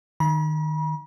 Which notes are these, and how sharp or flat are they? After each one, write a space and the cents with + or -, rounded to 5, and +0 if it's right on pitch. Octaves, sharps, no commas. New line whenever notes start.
D#3 -15 B5 -40